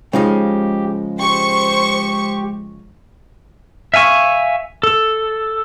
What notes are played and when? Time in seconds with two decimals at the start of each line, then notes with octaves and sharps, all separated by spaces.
0.13 C#3 F3 G#3 D#4 G4
1.19 G4 C5 C#6
3.94 E5 F5 G#5 C#6
4.83 A4